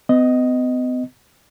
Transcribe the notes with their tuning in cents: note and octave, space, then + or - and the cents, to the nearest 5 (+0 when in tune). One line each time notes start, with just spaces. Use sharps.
B3 +45 D#5 +0